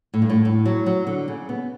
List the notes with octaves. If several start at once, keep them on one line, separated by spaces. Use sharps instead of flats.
A2
G2
A2
A2
F#3
F#3
D3
C#3
B3